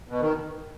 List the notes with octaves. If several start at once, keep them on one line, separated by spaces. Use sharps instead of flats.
B2
D#3